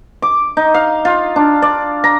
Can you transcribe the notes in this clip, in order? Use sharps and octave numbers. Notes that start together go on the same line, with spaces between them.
D6
D#4
F5
F4
D4
D5
A#5